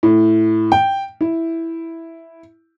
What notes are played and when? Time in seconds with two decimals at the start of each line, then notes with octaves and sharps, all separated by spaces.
0.03 A2
0.72 G5
1.21 E4